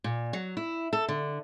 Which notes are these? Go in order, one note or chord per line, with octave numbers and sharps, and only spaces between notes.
A#2
F#3
E4
A4
D3